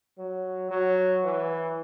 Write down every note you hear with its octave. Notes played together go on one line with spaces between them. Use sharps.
F#3
F#3
E3